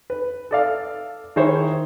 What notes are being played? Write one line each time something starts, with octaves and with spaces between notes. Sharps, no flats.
B4
A4 D5 F5
D#3 E4 G#4 C5 C#5